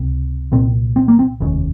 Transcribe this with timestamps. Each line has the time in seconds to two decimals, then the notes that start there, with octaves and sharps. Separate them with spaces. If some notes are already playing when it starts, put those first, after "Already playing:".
Already playing: C#2 C3
0.52 C2 A#2 C4
0.96 C4
1.08 A#3
1.19 C4
1.41 F1 D#2 C#3